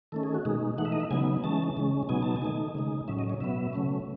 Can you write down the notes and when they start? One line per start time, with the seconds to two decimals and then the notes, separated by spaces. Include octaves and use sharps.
0.12 D#3 A3 C#4 A4
0.23 G#4
0.34 F#4
0.45 B2 G#3 D#4 G#4
0.78 E3 A3 D#4 F#5
0.85 E5
0.92 D#5
1.00 E5
1.11 C#3 F#3 B3 D#4 G#5
1.44 E3 G#3 C#4 A5
1.77 C#3 G#3 C#4
2.09 B2 F#3 B3 D#4 G#5
2.23 A5
2.36 G#5
2.42 D#3 A3 D#4
2.75 C#3 G#3 D#4
3.08 A2 F#3 C#4 E5
3.19 D#5
3.30 C#5
3.41 B2 F#3 B3 E5
3.73 C#3 F#3 A3 C#4